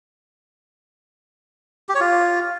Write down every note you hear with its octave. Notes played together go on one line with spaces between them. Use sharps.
G4
C#5
F4